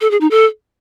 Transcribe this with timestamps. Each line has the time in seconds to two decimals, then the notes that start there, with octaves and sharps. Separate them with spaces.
0.01 A4
0.11 G#4
0.21 D#4
0.31 A4